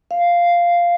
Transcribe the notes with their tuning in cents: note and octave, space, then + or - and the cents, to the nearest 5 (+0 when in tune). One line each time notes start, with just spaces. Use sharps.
F5 -5